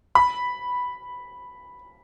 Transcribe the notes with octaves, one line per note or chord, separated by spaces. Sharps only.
B5